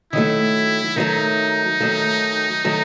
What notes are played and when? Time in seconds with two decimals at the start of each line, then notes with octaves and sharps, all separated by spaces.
0.12 D#3 F#3 A3 E4
0.96 D#3 F#3 A3 D#4
1.81 D#3 F#3 A3
2.65 D#3 F#3 A3